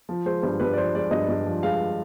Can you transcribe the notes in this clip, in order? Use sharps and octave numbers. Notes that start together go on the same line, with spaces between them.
F3
G#3 C5
G2 C5
G2 B4
D5
F3 C5
G#3 D5
G2 D#5
G2
F3
G#3 F5